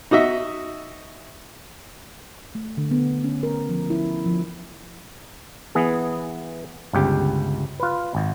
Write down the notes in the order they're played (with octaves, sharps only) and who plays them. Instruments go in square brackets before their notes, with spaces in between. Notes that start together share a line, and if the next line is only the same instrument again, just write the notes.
[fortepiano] D#4 F#4 D#5 E5
[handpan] A3
D3
B3
C#4
A#4
F3
E4
F3
[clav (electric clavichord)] E3 B3 G#4
G1 C#2 G4
F4 B4
G#1